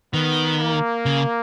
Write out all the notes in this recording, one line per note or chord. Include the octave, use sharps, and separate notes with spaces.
D#3 B3
A#3
C#3